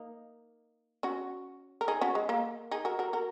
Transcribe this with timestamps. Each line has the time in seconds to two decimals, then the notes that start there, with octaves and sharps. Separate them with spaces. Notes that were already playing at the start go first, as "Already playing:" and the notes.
Already playing: A#3 D#4
1.03 C#4 F#4
1.81 A#4
1.88 D#4 G#4
2.01 C#4 F#4
2.15 G#3
2.29 A#3
2.71 D#4 G#4
2.85 F#4 A#4
2.99 F#4 A#4
3.13 F#4 A#4